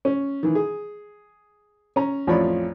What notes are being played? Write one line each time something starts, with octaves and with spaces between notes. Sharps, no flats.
C#4
D#3 E3
G#4
C#4 A#5
A1 F2 F4 C#5 D5 B5